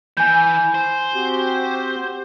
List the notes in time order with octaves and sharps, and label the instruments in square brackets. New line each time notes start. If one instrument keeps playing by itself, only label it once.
[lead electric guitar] E3 [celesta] G#5 G6
[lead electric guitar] C5
[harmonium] C4 F#4 G4